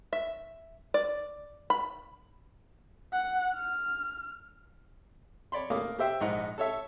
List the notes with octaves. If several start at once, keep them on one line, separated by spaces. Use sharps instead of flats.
E5
D5
B5
F#5
F6
C#5 D5 B5 C6
A3 A#3 F5 D6 D#6
G4 C5 E5 G5
A#1 G#2 D#4 F#5
A4 C#5 E5